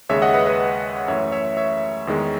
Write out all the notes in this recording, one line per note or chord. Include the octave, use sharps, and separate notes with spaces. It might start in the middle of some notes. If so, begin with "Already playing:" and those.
D#2 C#3 G#3 C#5 E5
D#5 F#5
B4 D#5
B4 D#5
F#2 E3 A3 C#5 E5
C#5 E5
C#5 E5
E2 D#3 G#3